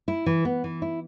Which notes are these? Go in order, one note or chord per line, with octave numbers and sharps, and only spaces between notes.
E4
E3
B3
E3
E4